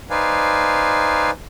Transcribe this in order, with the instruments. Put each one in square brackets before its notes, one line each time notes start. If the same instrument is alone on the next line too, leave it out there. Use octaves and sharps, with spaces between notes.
[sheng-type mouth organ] D#4 B4 C5 D5 F5 G#5